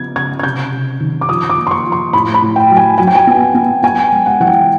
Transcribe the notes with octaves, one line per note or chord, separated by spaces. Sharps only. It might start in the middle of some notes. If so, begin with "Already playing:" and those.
Already playing: C#3 F3 B3 G#6
C#3 G#6
G#6
C3 G6
C3
D#3
D6
F3 D#6
D6
A#3
C6
C#6
F3
C6
A2 B5
B5
A2
G5
F#3
G#5
F#3 G#5
G5
G#5
B3
B3
B3 G#5
G5
G#3
F#5
E3 F#5
G5